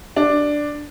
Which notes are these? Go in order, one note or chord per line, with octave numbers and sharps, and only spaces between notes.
D4